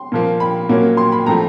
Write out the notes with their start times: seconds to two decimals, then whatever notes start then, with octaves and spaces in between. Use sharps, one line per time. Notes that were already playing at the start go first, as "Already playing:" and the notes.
Already playing: C6
0.12 A#2 F3 A#3
0.40 B5
0.69 A#2 F#3 A#3 C#4
0.97 C6
1.12 B5
1.26 A2 F3 A3 A#5